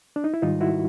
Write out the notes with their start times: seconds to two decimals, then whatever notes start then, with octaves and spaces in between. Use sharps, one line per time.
0.16 D4
0.24 D#4
0.34 E4
0.42 G#2 D#3 G3 D#4 F4
0.61 E4 F#4